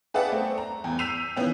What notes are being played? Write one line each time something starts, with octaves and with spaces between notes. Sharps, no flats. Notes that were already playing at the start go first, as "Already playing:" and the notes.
G#4 B4 D5 E5 F#5 A5
A3 C4
A#5
E2
E6 G6 B6 C7 D#7 F7
D#3 E3 B3 C#4